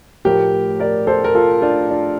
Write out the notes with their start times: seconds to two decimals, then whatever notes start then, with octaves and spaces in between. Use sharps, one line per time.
0.25 A2 F3 A3 G4 A#4
0.80 A#4 D5
1.07 A4 C5
1.24 A#4
1.35 F4 A4
1.62 D4 F4
1.91 D4